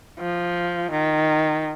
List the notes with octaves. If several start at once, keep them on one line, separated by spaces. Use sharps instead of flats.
F3
D#3